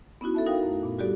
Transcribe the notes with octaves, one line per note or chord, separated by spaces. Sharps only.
B3 C#4 D#4 E4 F#4
A4 E5 A5
D#4 F#4 A#4 F5 G5
F#2 A3
A#2 B3
G3 F#4 G4 A4 D5